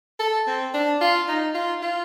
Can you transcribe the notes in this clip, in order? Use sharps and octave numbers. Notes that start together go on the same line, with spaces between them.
A4
C4
D4
F4
D#4
F4
F4